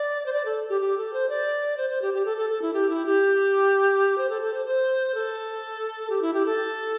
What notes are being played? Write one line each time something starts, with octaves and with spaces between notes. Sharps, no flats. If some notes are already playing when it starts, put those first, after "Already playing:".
Already playing: D5
C5
D5
A4
G4
G4
A4
C5
D5
C5
C5
G4
G4
A4
A4
A4
E4
G4
E4
G4
C5
A4
A4
C5
C5
A4
G4
E4
G4
A4